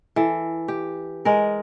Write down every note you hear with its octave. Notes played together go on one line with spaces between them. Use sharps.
E3 A4
G4
G#3 G#4 A#4